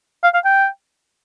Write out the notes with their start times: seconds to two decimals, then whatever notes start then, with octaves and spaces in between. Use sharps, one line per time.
0.24 F5
0.34 F5
0.45 G5